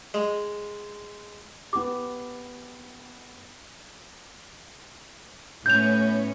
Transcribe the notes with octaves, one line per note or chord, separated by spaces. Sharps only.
G#3
B3 G4 D6
A2 B3 C#4 G6 F7